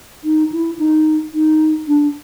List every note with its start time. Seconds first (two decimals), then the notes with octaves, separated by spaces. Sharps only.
0.24 D#4
0.52 E4
0.79 D#4
1.34 D#4
1.88 D4